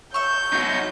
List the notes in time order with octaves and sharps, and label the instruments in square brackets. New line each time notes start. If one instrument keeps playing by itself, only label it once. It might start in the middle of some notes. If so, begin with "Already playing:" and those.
[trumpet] C#5 [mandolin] E5 C#6 [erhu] G6
[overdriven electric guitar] D#4 F#4